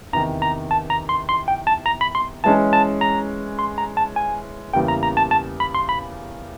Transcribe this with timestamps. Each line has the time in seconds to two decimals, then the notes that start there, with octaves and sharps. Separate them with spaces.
0.13 E2 C3 D#3 A#5
0.42 A#5
0.71 A5
0.90 A#5
1.09 C6
1.29 C6
1.48 G5
1.67 A5
1.86 A#5
2.01 B5
2.15 C6
2.44 E3 G#3 C#4 A5
2.73 A5
3.01 A#5
3.59 C6
3.78 A#5
3.97 A5
4.16 G#5
4.74 E2 C#3 E3 G3 A#3 G5
4.88 A#5
5.03 A#5
5.17 A5
5.31 A5
5.60 B5
5.75 C6
5.89 B5